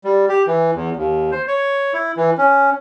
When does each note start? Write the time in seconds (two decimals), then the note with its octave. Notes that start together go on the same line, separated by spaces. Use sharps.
0.04 G3
0.29 G4
0.47 E3
0.75 E2
0.96 D#2
1.31 C5
1.48 C#5
1.94 E4
2.17 E3
2.38 C#4